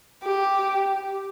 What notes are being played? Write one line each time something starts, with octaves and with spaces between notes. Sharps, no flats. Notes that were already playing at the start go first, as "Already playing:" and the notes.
G4